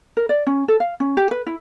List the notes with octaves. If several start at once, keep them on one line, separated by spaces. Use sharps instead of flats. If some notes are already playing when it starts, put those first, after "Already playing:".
A#4
D5
C#4
A4
F5
C#4
G4
B4
E4